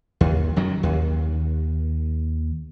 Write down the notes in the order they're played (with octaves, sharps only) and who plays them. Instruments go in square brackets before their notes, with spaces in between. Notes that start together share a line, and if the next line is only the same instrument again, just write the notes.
[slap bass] D#2
F#2 D#3 F#3
D#2